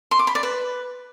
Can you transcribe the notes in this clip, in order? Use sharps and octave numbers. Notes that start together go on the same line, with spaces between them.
C6
D6
B5
D5
B4